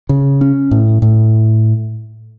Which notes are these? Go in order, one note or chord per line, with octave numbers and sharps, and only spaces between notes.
C#3
C#4
A2
A2